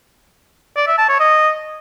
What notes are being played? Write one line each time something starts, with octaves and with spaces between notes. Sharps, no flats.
D5
E5
A5
C#5
D#5